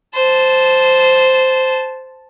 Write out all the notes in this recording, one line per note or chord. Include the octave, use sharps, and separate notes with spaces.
C5 A5